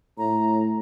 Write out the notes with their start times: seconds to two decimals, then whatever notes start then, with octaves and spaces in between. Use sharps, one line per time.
0.18 A2 A#5